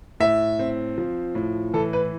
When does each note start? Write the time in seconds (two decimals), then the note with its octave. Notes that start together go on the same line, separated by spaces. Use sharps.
0.20 A2 E5
0.59 C4
0.98 F3
1.35 A2
1.74 E3 A4
1.93 B4